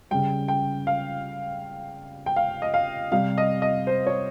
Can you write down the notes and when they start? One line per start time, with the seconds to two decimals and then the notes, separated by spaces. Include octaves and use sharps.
0.11 C#3 G3 G5
0.48 G5
0.87 F5
2.26 G5
2.36 F5
2.62 D#5
2.74 F5
3.12 C3 G3 F5
3.38 D#5
3.62 D#5
3.87 C5
4.07 C#5